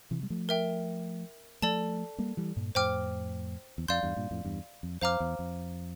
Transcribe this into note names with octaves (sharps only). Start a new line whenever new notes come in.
C3 E3
G3
F3 A3
A#4 E5 G5
F3 A3 A4 D5 A5
G3 A#3
E3 G3
G2 A#2
F2 A2 C5 G5 D6 F6
E2
F2 D5 F5 C6 G6
E2 G2
G2 A#2
F2 A2
E2 G2
F2
F2 C5 F5 A#5 D6 F6
E2
F2